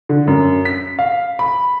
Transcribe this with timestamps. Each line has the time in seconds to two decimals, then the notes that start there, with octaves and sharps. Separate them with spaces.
0.09 D3
0.27 F#2
0.65 B6
0.99 F5
1.39 B5